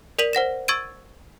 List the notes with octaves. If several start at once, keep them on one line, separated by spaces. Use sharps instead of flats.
A#4 D5 B6 D#7 F7 F#7
C5 F#5 A#6 E7
C#6 E6 G#6 A6 D7 D#7